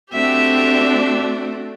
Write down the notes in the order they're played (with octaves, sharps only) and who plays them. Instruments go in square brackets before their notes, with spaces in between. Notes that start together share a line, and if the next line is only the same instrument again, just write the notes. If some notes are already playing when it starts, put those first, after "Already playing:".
[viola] A3 F#4 [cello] C4 D4 [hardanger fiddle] G4 E5